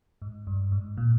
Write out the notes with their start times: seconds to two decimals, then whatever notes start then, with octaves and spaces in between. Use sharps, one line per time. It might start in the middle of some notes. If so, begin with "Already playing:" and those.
0.22 G#2
0.47 G2
0.72 G#2
0.97 A#2